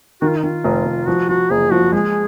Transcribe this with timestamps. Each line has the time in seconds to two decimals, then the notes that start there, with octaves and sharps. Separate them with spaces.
0.22 D#3 F#4
0.28 F4
0.37 D#4
0.43 D#3 F4
0.65 F1
0.86 F1
1.07 F3 F#4
1.29 F3 F#4
1.51 F#1 G#4
1.71 F3 F#4
1.92 G#3 G#4